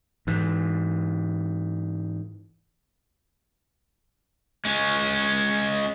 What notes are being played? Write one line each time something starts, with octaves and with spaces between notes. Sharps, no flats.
G#2 E3
G#3 C#4